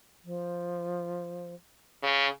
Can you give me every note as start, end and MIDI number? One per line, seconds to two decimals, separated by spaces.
0.24 1.54 53
2.03 2.27 49